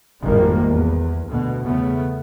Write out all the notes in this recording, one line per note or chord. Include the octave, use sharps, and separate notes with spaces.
G#1 F2 A2 D#3 G3 A#3
E2
D2 B2
E2 C#3 A3 B3